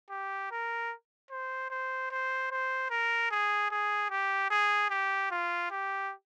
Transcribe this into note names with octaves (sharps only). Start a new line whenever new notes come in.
G4
A#4
C5
C5
C5
C5
A#4
G#4
G#4
G4
G#4
G4
F4
G4